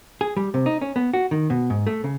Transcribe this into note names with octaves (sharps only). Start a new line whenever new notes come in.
G#4
G3
C3
D#4
C#4
B3
F#4
D#3
B2
G#2
A3
C#3